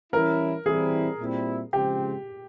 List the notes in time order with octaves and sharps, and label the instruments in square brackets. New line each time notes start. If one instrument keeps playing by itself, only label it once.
[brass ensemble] E3 G3 C#4 E4 [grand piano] A#4
[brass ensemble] E3 G3 C4 E4 [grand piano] G#4
[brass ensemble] A#2 G3 C4 E4
[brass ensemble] C#3 F3 G#3 C4 [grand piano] G4